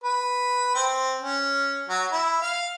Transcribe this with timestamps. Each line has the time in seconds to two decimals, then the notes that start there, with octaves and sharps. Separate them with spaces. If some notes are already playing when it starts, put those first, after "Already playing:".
0.04 B4
0.75 C4
1.21 C#4
1.89 F#3
2.12 E4
2.42 F5